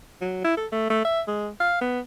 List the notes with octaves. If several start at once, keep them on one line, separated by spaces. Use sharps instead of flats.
F#3
E4
A4
A3
A3
E5
G#3
F5
B3